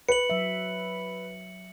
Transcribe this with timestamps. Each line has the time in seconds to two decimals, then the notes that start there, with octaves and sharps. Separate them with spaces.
0.09 B4 C#7 F#7
0.30 F#3 E5